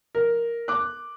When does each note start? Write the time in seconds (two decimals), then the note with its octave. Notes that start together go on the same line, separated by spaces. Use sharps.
0.15 A#4
0.68 D6 F#6